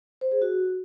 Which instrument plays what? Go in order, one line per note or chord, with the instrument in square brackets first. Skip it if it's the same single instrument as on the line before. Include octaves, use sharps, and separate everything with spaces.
[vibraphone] C5
G#4
F#4